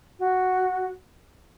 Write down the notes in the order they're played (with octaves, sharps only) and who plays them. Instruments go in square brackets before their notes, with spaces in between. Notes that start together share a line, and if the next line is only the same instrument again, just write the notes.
[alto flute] F#4